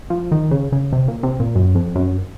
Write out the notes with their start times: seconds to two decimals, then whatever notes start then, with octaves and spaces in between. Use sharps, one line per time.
0.10 F3
0.32 D#3
0.51 C#3
0.72 C#3
0.93 C3
1.08 A#2
1.23 C3
1.40 A#2
1.55 F#2
1.75 F2
1.95 F#2